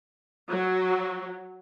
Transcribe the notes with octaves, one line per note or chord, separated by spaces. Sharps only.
F#3